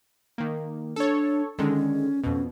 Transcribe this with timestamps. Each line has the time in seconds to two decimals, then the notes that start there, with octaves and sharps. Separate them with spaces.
0.38 D#3 A#3
0.96 D4 A4 C#5
1.59 D3 D#3 G#3 C#4
2.24 F2 B2 C#4